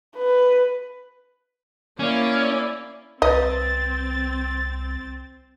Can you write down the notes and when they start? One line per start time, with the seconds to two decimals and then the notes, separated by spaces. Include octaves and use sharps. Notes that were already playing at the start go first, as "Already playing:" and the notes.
0.17 B4
2.00 A#3 C#4 E4 D5
3.22 C2 C4 B4 D#5 A6